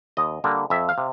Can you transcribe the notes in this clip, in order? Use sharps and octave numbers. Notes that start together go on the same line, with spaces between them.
D#2 D#5
D3 G3 A#3
F2 E5
F5
C3